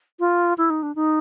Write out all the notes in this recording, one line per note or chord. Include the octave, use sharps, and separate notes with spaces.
F4
E4
D#4
D4
D#4